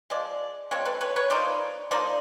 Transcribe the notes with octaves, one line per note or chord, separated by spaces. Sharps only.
F3 G#3 D5
F3 G#3 C4 C#5
A4 B4
B4 C#5
B4 C#5
F3 A#3 D#4 C5 D5
F3 A#3 D#4 C5 D5